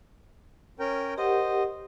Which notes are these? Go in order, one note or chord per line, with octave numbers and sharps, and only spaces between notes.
C#4 A#4 G5
G4 A#4 C5 D#5 F#5